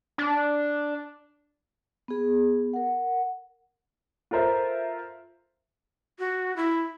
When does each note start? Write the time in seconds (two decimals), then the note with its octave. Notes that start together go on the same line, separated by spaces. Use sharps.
0.18 D4
2.08 B3 G#4
2.73 A#4 F#5
4.31 F4 A4 A#4 C5 E5
6.19 F#4
6.56 E4